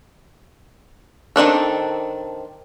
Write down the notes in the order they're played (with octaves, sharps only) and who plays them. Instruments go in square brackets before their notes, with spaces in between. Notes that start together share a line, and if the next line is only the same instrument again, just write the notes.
[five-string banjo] D#3 C4 D4 A4